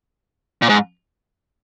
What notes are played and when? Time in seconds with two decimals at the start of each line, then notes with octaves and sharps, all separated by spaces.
0.62 A#2
0.69 G#2